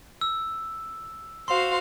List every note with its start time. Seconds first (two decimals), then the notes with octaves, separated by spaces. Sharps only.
0.21 E6
1.48 F#4 C5 F5 C6